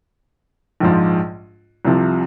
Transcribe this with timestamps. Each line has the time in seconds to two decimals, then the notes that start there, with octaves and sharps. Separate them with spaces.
0.80 A#1 G#2 F3
1.85 C2 C3 F3